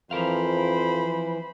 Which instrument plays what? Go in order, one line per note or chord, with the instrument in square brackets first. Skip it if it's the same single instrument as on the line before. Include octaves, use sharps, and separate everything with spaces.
[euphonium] F2 [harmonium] E3 [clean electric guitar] F3 A#4 F5 [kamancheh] C5 B5